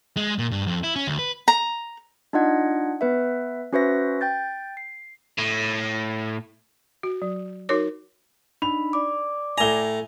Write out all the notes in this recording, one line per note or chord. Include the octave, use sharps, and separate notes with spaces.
G#3
A#2
G2
F2
E4
C#4
D2
B4
A#5
D4 D#4 F4 D#5 F#5 G#6
B3 B4 E5
C#4 F#4 B4 C5 E5 A#6
G5 G6 A6
C7
A2
F#4
F#3
D#4 F#4 A#4 C#5 D6
D4 D#4 B5 F7
D5 D6
A2 G#5 A#5 G7